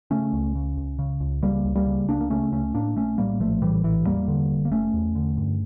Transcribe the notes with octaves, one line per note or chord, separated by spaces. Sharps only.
C#3 A3 C#4
C#2
C#3
C#2
C#3
C#2
C#3 G3 A#3
C#2
G3 A#3
C#3
C#2 A#3 D4
A#3
C#3 A3 C#4
C#2 A3 C#4
A2 A#3 D4
A#1 A3 C#4
A2 G3 A#3
A#1 F3 A3
A2 E3 G3
A#1 E3
E2 G3 A#3
D3
F1
A#3
F1 A3 C#4
E2
D3
G2